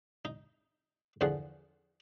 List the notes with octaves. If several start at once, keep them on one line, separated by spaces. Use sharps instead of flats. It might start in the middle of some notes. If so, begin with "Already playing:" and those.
D#4
E2 D3 F3 F4 G#4 F#5